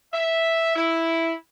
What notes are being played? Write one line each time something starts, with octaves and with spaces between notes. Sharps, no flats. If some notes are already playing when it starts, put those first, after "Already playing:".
E5
E4